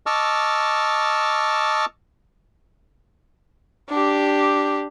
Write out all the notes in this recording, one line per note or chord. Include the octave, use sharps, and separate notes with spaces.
D#5 A5 C#6 D6 E6 F6
D4 G4